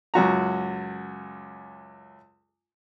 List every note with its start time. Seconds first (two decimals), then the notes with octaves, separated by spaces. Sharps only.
0.14 C#2 F#2 F#4 A#5